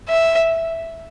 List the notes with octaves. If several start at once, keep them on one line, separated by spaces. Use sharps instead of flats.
E5